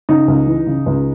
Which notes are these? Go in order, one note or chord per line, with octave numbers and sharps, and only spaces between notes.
C#3 D#4
C#2
E3
C#3
C#2